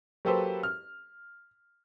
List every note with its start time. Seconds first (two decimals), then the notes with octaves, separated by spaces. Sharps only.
0.25 F#3 A#3 G4 A4 B4 C5
0.63 F6